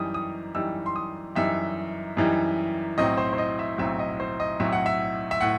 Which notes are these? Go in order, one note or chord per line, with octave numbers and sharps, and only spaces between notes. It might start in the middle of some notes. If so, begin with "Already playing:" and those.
Already playing: F#2 E3 G3 D#4 D#6
D#6
F#2 E3 G3 D#4 E6
C6
D#6
F#2 E3 G3 D#4 E5
F#2 E3 G3 D#4
B1 A2 F#3 C4 D#5
C5
C5
D#5
E5
B1 A2 F#3 C4 E5
D#5
C5
D#5
B1 A2 F#3 C4 E5
F#5
E5
E5
A2 F#5